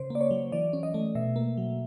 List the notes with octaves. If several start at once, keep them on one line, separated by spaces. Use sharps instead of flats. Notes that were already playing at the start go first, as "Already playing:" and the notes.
Already playing: C#3 C5
A#3 D5
C#5
F#3
E3 D5
C#4
D#5
A3
B2 E5
A#3
F#3